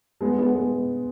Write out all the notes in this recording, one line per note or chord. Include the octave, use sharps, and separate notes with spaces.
G#3 B3
G#3 B3
G#3 B3